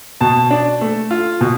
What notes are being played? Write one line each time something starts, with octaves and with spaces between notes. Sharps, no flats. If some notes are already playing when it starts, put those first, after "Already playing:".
B2 A5
D4
A3
F4
B2